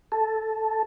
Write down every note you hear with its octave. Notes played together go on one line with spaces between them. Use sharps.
A4